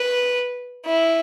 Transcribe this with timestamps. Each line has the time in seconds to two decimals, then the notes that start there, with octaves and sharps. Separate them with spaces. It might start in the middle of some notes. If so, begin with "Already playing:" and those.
Already playing: B4
0.87 E4